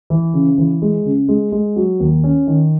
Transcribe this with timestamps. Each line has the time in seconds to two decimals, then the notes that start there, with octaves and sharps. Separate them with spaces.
0.10 E3
0.34 C#3
0.58 E3
0.82 G#3
1.05 C#3
1.29 G#3
1.52 G#3
1.76 F#3
2.00 D#2
2.24 C#4
2.47 D#3